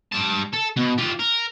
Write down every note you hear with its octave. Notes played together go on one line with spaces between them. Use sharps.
G3 A5
A4
B2
F4 G4
A#4